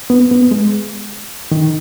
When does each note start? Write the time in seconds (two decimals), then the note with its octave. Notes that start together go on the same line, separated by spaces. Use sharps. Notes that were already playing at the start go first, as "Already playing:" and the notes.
0.10 B3
0.31 B3
0.51 G#3
1.52 D#3